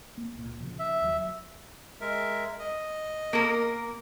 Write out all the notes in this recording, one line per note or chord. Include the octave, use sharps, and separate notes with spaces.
A#3
C#2 A#2
C#3 F3
E5
D#2 F#3
G#3 A#4 E5
D#5
A#3 A#4